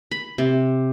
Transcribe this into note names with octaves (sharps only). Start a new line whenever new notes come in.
B5
C3